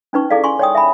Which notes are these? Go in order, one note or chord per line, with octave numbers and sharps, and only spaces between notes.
C#4 D#4 B4 C#6
E4 G#4 A4 D5 F5
G#5 C6 C#6
C#5 D5 G5 D#6
E5 G#5 B5